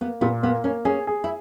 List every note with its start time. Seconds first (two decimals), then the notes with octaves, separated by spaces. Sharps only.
0.01 A#3 B3
0.21 A#2 B3
0.43 A#3 B3
0.64 A#3 C#4
0.85 C#4 G#4
1.07 G#4
1.24 E4